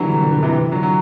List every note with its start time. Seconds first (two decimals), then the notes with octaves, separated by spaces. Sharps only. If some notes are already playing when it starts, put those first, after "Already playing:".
Already playing: D3 E3 F#3 G3
0.12 D3
0.22 D3
0.32 D3
0.43 C3 E3
0.71 D3 F#3
0.83 F#3